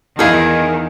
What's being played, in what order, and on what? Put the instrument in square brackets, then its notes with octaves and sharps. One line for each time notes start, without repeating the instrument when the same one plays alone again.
[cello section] E2 D#3 [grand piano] D#4 E4 F5 [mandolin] G#4 A#4